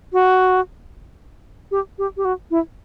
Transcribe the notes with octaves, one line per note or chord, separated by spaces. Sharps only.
F#4
G4
G4
G4
F#4
E4